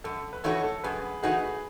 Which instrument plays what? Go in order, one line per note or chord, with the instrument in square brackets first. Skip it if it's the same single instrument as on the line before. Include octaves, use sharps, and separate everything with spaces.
[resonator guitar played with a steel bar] F#2 [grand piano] A4
[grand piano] B4
[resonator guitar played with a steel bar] E3 A3 D#4 F#4 [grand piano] A4 C#5
[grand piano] A4
[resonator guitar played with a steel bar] F#2 [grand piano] G#4 B4
[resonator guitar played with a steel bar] E3 A3 D#4 F#4 [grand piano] G#4 B4